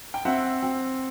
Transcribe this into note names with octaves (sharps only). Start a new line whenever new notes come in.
G5
C4 E5 F#5
C4